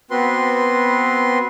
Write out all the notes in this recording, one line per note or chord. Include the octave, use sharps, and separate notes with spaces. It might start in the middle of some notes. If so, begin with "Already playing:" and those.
B3 C4 F#4 B4 C6